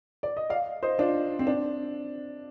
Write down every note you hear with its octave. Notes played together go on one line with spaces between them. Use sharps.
D5
D#5
D5 F5
C5 D#5
D4 F4
C4
D4